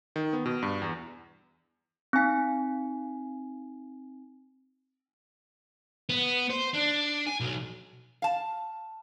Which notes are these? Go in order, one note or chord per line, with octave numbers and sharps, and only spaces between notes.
D#3
B3
B2
G2
E2
C4 D#4 G#5 B6
B3
C5
D4
G#5
B1
F5 A5